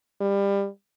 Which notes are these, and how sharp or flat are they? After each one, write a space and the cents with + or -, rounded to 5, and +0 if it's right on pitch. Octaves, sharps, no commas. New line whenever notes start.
G3 +25